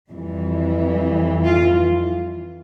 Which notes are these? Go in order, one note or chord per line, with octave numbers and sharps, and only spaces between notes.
F2 E3 G3
F4